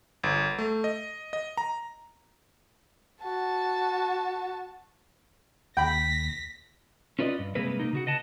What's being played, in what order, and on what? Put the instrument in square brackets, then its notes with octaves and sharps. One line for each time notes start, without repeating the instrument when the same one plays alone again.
[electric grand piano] G1
A3
D#5
D#5
A#5
[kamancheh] F#4 A5
[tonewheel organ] D#2 [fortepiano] G5 B5 [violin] A#6 B6
[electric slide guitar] C#4 F4 B4 D5 D#5
G2
C3 G3 G#3 A#3 C4 B4
A#3 D#4
C#3 F#4 F#5
B4 D#5 F#5 A5